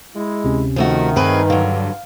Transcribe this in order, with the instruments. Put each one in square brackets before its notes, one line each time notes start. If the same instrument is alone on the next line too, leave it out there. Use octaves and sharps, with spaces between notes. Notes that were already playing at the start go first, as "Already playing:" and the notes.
[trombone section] G#3 E4
[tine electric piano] D2 C3 C#4
[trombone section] D#3 [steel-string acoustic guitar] F3 A3 F#4
[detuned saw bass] G2 [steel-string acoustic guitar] C4 G#4 B4
[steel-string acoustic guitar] D3 F#3 [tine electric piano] F5